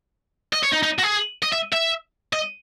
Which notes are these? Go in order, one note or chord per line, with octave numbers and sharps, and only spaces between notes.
D#5
C#5
D#4
D#4
F#4
G#4
D#5
E5
E5
D#5